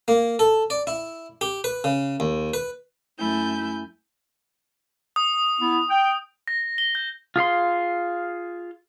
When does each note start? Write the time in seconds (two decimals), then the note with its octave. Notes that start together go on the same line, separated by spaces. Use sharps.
0.08 A#3
0.39 A4
0.70 D5
0.87 E4
1.41 G4
1.64 B4
1.84 C#3
2.20 D#2
2.54 B4
3.18 F#2 A3 E4 G#5 G6
5.16 D#6
5.60 B3 E4
5.89 G5
6.48 A#6
6.78 G7
6.95 G6
7.36 F4 G#4 F5 C6